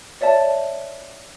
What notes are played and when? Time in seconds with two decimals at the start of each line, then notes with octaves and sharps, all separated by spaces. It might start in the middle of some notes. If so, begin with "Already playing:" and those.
0.21 C#5 D5 E5 A5